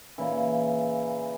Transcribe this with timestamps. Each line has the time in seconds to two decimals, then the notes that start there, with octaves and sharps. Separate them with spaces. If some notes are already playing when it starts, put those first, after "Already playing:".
0.18 A#2 C#3 E3